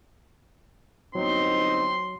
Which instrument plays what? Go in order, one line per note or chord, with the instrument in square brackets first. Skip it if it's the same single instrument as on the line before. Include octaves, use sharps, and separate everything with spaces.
[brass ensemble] G1 D#4 [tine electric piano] F#3 [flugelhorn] C4 [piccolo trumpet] C6